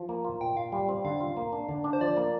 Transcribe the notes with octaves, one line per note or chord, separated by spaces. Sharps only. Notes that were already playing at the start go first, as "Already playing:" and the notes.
Already playing: F3
A#3
F4
A#2 G5
F4 F5
G3
C4
D3 F5
F4
A#3
D4
D3
D4
C5
F3 D5
A#3